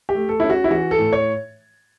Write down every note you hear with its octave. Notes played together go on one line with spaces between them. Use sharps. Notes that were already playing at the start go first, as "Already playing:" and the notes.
G4
A3
A4
C#4 E4
F#4
E4
E3 F#4
A4
A2
C#5